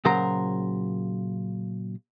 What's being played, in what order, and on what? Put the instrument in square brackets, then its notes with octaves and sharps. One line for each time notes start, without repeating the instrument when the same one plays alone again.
[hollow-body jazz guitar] A#2 C#3 F#3 A#4 C5 A#5